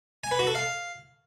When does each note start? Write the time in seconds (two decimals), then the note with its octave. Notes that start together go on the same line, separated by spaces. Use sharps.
0.24 G#5
0.31 B4
0.39 F#4
0.47 A4
0.55 F5